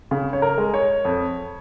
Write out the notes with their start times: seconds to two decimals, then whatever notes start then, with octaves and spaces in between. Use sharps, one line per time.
0.11 C#3
0.33 C#5
0.42 A#4
0.58 G#3
0.74 C#5
1.05 F2